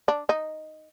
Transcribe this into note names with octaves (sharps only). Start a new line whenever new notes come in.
D4
D#4